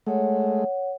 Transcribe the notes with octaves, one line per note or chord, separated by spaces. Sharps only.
G#3 A3 C#5 F#5